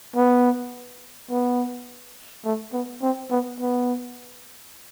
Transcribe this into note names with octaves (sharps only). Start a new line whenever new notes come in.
B3
B3
A3
B3
C4
B3
B3